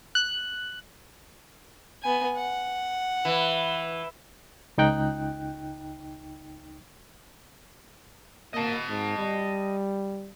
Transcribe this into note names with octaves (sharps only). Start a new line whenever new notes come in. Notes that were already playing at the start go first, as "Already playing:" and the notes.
F#6
B3 G#5
F#5
E3
C#2 D#4 G5 F#6
A#3 D#5 A5
G#2
G3